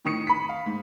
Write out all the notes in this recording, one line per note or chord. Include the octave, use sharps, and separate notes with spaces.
A2 D#3 C#6 D#6 C#7
B5 B6
F5
G#2